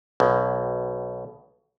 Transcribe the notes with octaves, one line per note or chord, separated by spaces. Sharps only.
B1 B2